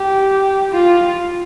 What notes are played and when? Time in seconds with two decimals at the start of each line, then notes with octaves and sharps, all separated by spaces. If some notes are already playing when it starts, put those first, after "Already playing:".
Already playing: G4
0.71 F4